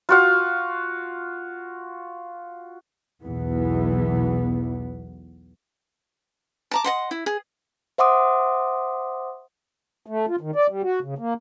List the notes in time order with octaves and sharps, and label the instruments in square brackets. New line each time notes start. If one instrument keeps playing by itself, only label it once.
[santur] F4 F#4 F5
[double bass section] B1 E2 E3 B3
[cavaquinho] A5 A#5 D6
D#5 F#5 C6
E4
G#4
[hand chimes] C5 E5 F#5 C6 D6 D#6
[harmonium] A3
F4
D#3
D5
G3
F#4
C#3
A#3